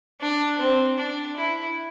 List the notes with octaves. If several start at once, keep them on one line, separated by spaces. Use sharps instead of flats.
D4
C4
D4
E4